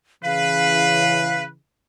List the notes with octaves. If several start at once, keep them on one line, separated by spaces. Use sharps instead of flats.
C#3 E3 B4 F5